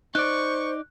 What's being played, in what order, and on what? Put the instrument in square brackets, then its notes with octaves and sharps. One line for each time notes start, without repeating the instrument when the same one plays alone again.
[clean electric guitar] D#4 D5 [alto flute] C5 [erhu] C#6 [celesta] F#6